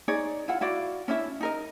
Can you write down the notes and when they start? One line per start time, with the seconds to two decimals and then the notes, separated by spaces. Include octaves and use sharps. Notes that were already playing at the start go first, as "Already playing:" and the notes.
0.08 D#4 G#4 C#5 D5
0.48 E4 F4 F#5
0.61 E4 F#4 D5 F5
1.08 C#4 D4 E4 E5
1.41 D#4 A#4 D#5